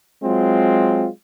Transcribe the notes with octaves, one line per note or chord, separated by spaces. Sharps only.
F#3 G#3 C4 F4